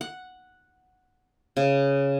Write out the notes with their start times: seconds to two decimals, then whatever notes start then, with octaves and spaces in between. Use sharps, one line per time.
0.01 F#5
1.57 C#3